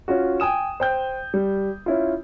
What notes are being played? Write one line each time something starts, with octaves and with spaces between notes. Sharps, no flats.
C#4 F4 F#4
G5 G#5 D#6 E7
C5 G5 G6
G3
C#4 E4 F4